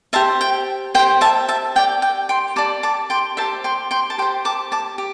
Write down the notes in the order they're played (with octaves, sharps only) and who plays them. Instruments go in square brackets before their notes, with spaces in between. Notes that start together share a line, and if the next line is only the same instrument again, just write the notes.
[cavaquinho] G4 C5 E5 A5
G5
C5 G5
G4
E5 A5
E5 A5
G4 D5 G5
G5
G5 C6
G4 D5 A5 D6
A5 D6
G5 C6
C5 E5 A5
G4
G5 C6
G5 C6
A5
G4 G5 C6
C5
A5 D6
A5 D6
G4